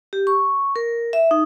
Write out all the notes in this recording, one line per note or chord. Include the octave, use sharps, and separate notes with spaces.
G4
C#6
A#4
E5
D#4